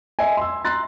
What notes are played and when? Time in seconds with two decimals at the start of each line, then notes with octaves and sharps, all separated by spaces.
0.19 D#5 E5 G#5
0.37 C6 E6
0.65 A#5 C6 F#6 A6